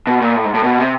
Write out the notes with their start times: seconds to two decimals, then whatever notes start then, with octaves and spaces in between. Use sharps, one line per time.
0.07 B2
0.21 A#2
0.36 A2
0.45 G#2
0.54 A2
0.64 B2
0.78 C3